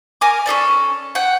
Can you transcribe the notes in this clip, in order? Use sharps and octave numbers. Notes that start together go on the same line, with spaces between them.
A#4 G#5 D6
C#4 G#4 A4 D5
F#5 G5